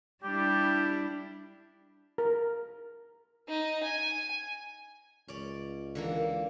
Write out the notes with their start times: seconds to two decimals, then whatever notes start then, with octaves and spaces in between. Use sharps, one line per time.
0.23 G3 D4 E4 G4
2.18 A#4
3.48 D#4
3.83 G#5
5.28 C#2 C#4 D5
5.95 D3 E3 A#3